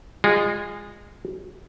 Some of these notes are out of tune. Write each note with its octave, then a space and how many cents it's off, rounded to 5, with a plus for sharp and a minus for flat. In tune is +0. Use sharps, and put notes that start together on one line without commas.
G#3 -20 F4 +10